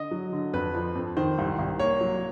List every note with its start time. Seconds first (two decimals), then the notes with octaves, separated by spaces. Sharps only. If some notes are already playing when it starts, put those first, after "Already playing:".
Already playing: D3 D#5
0.11 F#3
0.33 D3
0.53 F2 B4
0.75 F3
0.95 F2
1.17 D#3 C5
1.38 C2
1.59 C2
1.79 A#3 C#5
2.01 F#3